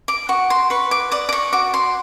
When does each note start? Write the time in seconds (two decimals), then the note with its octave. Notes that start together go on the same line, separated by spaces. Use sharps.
0.08 D6
0.29 F#4 C#6
0.50 C6
0.70 B4 C#6
0.91 D6
1.12 D5 D#6
1.29 D6
1.33 C#6
1.53 F#4 D6
1.74 C6